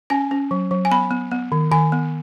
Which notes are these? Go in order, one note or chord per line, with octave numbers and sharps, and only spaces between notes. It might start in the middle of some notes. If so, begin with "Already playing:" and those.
C#4 G#5
C#4
F#3
F#3
G#5
B3 B5
B3
B3
D#3
D#3 G#5
B3